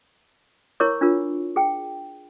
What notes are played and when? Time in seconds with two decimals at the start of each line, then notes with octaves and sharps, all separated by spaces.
0.80 E4 A#4 C#5 C#6 D6
1.01 D4 F4 A#4
1.56 G#4 G5